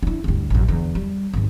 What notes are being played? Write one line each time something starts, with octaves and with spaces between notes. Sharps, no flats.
D4 E4
D2 G2
A1 F#2
E2 D3
G3
G#1 D#2